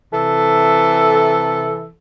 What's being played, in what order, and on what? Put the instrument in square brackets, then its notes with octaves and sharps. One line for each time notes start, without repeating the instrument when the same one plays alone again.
[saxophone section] C3 E3 A4